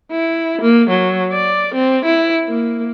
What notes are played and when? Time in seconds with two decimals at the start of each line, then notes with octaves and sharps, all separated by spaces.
0.11 E4
0.62 A#3
0.90 F#3
1.32 D5
1.75 C4
2.05 E4
2.49 A#3